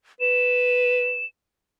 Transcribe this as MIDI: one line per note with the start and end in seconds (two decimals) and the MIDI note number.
0.21 1.21 71
0.21 1.25 100